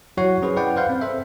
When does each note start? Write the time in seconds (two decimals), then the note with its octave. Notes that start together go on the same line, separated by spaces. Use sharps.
0.17 F#3 E4 F#4 C#5 F#5 C7
0.42 F#3 C#4 G#4 B4 C5
0.56 E4 B4 D5 F#5 G5
0.76 B4 C5 F5 F#5 G6
0.89 C4
1.01 A4 C5 E5